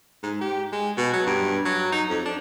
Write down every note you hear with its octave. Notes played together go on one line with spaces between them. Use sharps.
G#2
G4
G#3
B2
F#3
G2
F#3
D#4
F2
D4